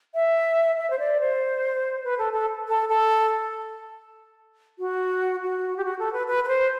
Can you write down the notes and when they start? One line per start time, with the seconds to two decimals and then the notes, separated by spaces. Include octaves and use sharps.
0.15 E5
0.78 E5
0.90 C5
0.99 D5
1.20 C5
2.04 B4
2.19 A4
2.33 A4
2.68 A4
2.89 A4
4.79 F#4
5.43 F#4
5.77 G4
5.84 F#4
5.99 A4
6.13 B4
6.27 B4
6.44 B4
6.48 C5